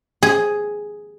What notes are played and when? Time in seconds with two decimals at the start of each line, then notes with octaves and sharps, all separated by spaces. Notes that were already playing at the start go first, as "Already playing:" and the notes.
0.23 G#4